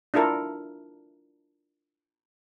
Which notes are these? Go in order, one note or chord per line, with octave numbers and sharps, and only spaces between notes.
D4 E4 F4 A4 A#4